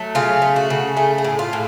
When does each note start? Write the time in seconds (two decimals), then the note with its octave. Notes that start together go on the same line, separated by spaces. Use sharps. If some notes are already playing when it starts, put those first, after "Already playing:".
Already playing: F#3 A3
0.15 C#3 F4
0.42 A3
0.56 F#4
0.70 C#3
0.97 A3 G#4
1.18 G#4
1.24 A2
1.39 F4
1.53 A2